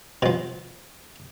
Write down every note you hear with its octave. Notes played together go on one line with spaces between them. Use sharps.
B2 F3